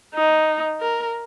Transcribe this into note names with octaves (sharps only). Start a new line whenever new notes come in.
D#4
A#4